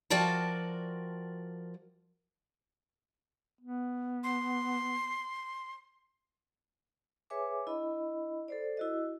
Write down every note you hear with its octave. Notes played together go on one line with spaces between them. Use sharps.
F3 F#4 A#4 D5 G5 A5
B3
C6
G#4 B4 C#5 E5 G#5 D6
D4 E4 D#5 B5
A4 C5 D5
E4 F#4 D#5